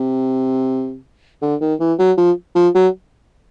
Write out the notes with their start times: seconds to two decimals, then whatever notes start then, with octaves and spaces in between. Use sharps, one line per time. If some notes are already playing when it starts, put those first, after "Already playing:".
Already playing: C3
1.42 D3
1.61 D#3
1.80 E3
1.99 F#3
2.18 F3
2.55 F3
2.75 F#3